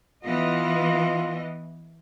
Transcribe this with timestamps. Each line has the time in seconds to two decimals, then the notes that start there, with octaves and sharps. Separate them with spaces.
0.24 E3 B3 F4 D#5